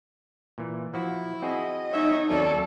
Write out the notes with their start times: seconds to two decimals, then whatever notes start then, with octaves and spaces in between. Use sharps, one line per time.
0.58 A#2 E3
0.94 F3 E4 F#4
1.42 C4 F#4 G#4 D#5
1.92 F#2 D#4 C#5 E5
2.30 D#2 F#3 C4 C#4 A4 A#4 D5